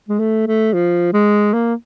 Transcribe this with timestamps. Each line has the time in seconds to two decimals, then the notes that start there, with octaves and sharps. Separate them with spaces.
0.09 G#3
0.19 A3
0.47 A3
0.74 F3
1.13 G#3
1.53 A#3